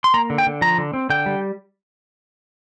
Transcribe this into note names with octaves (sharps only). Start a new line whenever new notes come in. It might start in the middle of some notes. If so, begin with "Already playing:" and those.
C6
A#3 A#5
D3
G5
D3
F3 A#5
D3
C4
D3 G5
G3